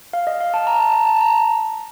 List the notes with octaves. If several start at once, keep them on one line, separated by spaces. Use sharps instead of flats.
F5
D#5
F5
A5
A#5
A5
A#5
A5
A#5